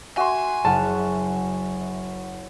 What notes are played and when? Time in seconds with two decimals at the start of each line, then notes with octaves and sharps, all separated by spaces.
0.17 F#4 E5 G#5 C6
0.65 F#1 F#5 A5 F6